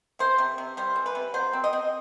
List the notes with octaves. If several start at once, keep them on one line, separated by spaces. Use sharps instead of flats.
C3 C5
C3
C3
G3 C5
E3
B4
C3
F#3 C5
C4
D#5
C4